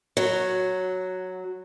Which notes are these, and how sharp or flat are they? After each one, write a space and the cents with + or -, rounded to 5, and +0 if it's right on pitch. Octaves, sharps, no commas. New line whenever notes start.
F#3 +0 F#4 -15